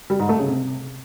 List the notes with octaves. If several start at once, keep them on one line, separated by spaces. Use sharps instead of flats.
G3
G#2
A3
C#3
C3